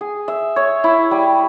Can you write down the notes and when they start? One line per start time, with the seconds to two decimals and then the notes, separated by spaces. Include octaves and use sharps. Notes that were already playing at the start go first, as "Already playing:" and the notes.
0.01 G#4
0.28 E5
0.56 C#5
0.84 E4
1.11 G3